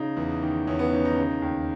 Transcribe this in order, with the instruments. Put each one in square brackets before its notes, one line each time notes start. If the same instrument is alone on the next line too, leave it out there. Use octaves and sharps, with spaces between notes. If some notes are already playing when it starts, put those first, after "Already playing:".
Already playing: [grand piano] C#3 D#4
E2
D#3
E2 C#4
B3
D#3 C#4
D#4
C#3
D#2